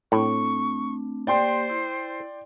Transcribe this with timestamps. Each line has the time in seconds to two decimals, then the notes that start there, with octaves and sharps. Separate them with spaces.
0.12 A2 A3 C4 D4 C#6
1.27 A#3 G4 C5 D5 G5 C6
1.70 E4